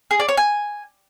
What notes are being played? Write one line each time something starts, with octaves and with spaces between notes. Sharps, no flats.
G#4
D5
C#5
G#5